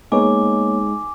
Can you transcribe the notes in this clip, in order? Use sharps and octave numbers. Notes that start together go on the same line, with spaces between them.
G#3 A#3 B3 D#4 C#5 G#5 D6